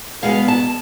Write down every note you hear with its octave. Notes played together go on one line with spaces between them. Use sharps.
B2 G#3 B3 F5
A5